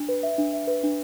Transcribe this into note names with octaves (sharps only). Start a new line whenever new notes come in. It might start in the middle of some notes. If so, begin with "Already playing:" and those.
Already playing: D4
B4
E5
D4
E5
B4
D4